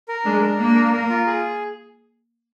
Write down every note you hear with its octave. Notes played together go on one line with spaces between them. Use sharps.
A#4
G#3 D4
A#4
A#3 D4
A#4
A#4
F4
G#4